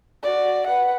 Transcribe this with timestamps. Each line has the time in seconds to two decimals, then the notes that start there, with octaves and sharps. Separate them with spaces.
0.23 F#4 D5
0.67 B4 F#5